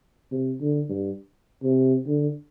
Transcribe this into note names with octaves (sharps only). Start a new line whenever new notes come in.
C3
D3
G2
C3
D3